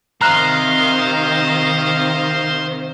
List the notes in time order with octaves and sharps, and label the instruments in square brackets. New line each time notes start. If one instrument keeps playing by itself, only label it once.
[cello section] C3 D#3 [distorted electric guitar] C5 [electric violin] D#5 F5 [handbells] A#5 F6 F#6